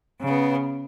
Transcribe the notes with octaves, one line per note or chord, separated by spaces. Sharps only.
C#3 B3